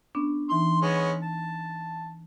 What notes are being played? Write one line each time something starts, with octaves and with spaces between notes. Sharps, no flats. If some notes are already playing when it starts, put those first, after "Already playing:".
B3 C#4 D4
E3 D#4 C6
G#3 B3 C#4
A5